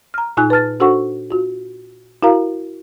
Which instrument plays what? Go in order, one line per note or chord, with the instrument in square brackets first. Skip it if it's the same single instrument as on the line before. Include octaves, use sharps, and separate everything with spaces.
[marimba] A#5 F6
A#2 D#4 F4 G#5 F#6
B4 A5 F6 A6
D4 F#4 A4 C5 F#5 C#6
F4 F#4
E4 F#4 A#4 F5 A#5